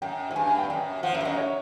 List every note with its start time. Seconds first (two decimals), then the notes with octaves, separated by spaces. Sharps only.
0.02 F#2 G5
0.31 G#2
0.35 G2 G#5
0.47 G#5
0.58 G5
0.70 F#2
1.03 F3 F#5
1.15 F#2 E5
1.21 G2
1.25 F#2 D#5
1.37 C#5